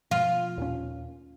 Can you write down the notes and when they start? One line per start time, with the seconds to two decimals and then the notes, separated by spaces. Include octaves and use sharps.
0.11 B2 F3 F4
0.58 D#2 A#2 C#4